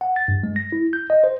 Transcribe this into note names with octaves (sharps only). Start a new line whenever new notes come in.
F#5
A6
G2
G#3
A#6
E4
G6
D#5
C5